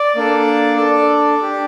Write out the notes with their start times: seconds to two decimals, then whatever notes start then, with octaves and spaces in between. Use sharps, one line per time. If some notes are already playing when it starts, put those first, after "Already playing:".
Already playing: D5
0.16 A#3 D4 A4
0.77 D4 A4
1.39 D4 G4